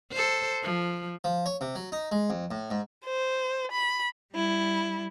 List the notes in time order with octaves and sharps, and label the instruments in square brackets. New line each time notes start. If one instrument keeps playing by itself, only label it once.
[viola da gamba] A4 C5
F3
[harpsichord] F3
C#5
C3
F#3
D#4
G#3
F2
A2
G#2
[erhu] C5
B5
[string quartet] G3 E4